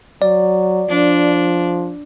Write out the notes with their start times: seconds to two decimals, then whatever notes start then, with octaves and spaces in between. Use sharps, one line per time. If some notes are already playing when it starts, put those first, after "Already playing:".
0.22 F#3 D5
0.90 F3 D4